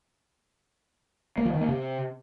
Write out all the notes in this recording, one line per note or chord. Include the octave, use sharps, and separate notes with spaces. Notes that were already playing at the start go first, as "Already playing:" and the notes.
A#3
F3
D#3
A#3
C3